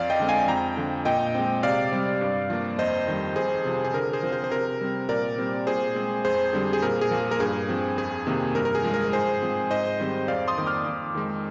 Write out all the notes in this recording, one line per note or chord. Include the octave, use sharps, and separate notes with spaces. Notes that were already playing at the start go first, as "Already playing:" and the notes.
Already playing: F2 D5 F5
D#5 G5
D3 G#3 C4
F5 G#5
F2 G5 A#5
D3 F3
A#2 D#5 G5
G#3 C4
C3 D5 F5
G3 C4
G2
F3 A#3
F2 C5 D#5
D#3 G3
F2 G#4 C5
C3 F3
G#4
D3 A#4
G#4 C5
F3 C4
G#4 C5
C5
C3 A#4
G3 C4
A#2 A#4 D5
G3 C4
A#2 G#4 C5
G#3 C4
F2 G#4 C5
D3 G3 C4
G#4
A#2 A#4
G#4
F3 A#3
G#4
A#4
G2 G#4
F3 C4
F2 G#4
C3 D#3 A#3
G2 A#4
A#4
G#4
F3 G#3
A#4
G#2 G#4 C5
F3 G#3 C4
G#2 C5 D#5
D#3 G3 C4
F2 D5 F5
C6 D#6
D#3 A#3
D6 F6
F2
D#3 G#3